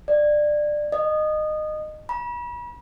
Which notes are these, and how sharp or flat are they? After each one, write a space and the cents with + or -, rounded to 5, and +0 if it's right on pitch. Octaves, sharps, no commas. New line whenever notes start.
D5 +20
D#5 -20
B5 -40